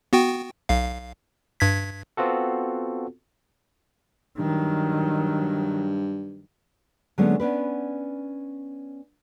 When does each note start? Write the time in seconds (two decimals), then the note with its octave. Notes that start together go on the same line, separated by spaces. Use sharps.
0.13 B3 F#4 G5
0.69 B1 F5
1.60 G2 G#6 B6
2.17 B3 C4 F4 F#4 A4
4.38 G2 D#3 F#3
7.18 D3 F#3 G#3 A#3 B3 C#4
7.40 B3 C#4 D4 B4